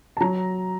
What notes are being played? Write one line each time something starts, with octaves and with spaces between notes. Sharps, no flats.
A5
F#3 A#5